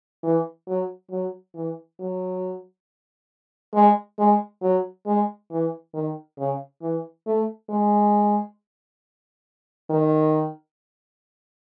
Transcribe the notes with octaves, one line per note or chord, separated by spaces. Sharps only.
E3
F#3
F#3
E3
F#3
G#3
G#3
F#3
G#3
E3
D#3
C#3
E3
A3
G#3
D#3